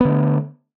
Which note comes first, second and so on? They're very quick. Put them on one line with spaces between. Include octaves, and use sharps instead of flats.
B3 D3 A3